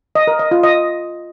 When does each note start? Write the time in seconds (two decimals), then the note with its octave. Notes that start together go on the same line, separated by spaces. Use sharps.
0.15 D#5
0.27 A#4
0.39 D#5
0.51 F4
0.63 D#5